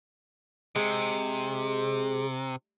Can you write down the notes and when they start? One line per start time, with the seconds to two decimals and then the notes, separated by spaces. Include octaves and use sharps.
0.76 C3 G#3